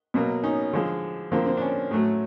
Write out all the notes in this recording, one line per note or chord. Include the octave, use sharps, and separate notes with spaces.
B2 F#3 A#3
C#4 D#4
D3 F3 G#3
D3 F3 A#3 C4
C4
D4
C#4
A2 F#3 A3